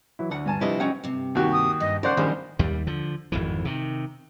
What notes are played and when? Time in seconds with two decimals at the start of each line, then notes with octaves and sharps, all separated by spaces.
0.19 E3 F#3 E4
0.31 D2 D4 F#5
0.46 G2 G#5 A5
0.61 C3 F3 G3 D4 E4 B4 D#5
0.80 C#4 D#5 F#5 G5
1.03 G2 C3
1.35 D#2 F#4 G4
1.53 D#6
1.80 G2 D#5
2.03 C#3 A#4 C5 D5 F#5
2.17 A#1 D#3 G3 G#3 C#4
2.59 D#2 G3
2.87 D3 F3
3.32 G#1 F2 E3
3.65 C3 D#3